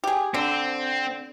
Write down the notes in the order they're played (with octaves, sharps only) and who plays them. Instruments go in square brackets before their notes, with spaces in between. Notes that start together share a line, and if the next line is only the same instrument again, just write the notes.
[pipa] G4 G#4
[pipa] D3 [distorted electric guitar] C4